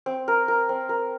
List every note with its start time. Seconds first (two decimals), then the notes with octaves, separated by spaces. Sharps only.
0.06 C4
0.28 A#4
0.48 A#4
0.69 C4
0.89 A#4